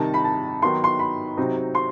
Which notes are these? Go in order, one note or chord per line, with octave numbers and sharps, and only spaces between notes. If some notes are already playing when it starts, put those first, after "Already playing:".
Already playing: C3 D#3 G3 D#4 A5
B5
A5
D#3 F#3 B3 D#4 C6
C6
B5
C3 F#3 C4 D#4
C6